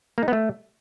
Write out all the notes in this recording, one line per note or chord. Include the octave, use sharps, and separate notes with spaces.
A#3
D#4
B3
A3